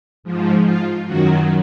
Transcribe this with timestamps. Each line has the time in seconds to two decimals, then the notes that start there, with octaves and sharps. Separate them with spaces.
0.24 G#2 F3
0.65 F4
1.06 F#2 D#3 F#3 F#4